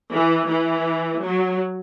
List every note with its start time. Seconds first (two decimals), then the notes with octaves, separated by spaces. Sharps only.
0.12 E3
0.48 E3
1.24 F#3